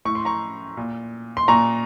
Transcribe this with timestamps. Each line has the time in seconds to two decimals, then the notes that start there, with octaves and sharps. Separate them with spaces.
0.05 A2 C#6
0.15 C6
0.25 A#5 C#6
0.77 A#2
1.37 C6
1.48 A#2 A#5 C#6